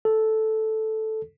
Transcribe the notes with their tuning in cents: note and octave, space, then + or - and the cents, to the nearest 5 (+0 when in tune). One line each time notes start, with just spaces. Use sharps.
A4 -5